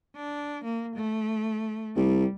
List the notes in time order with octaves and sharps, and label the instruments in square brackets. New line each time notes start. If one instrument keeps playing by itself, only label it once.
[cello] D4
A#3
A3
[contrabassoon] C2 [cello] G3